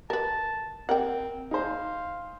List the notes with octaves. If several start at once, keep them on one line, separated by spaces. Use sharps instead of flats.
A#4 B4 A5
C4 A#4 F#5 G5
D#4 G#4 C5 F5